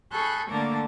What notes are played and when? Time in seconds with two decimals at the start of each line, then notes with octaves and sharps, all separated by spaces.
0.12 G#4 A4 B5 C#6 F#6 G6
0.50 D3 A3 A#3 A#4 A5 D6